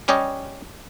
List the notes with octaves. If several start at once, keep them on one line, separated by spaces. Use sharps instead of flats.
G3 C#4 G4 C#5 D#5